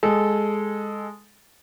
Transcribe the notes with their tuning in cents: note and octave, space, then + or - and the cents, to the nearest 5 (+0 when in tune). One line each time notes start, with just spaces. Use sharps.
G#3 -5 A4 -15